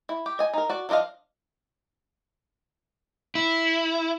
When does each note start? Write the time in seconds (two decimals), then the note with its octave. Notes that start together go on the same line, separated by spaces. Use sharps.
0.09 E4
0.26 G4
0.39 D#5 G#5
0.54 D#4 A#4
0.69 F#4 D5
0.89 F3 D4 F4 D#5 F5
3.35 E4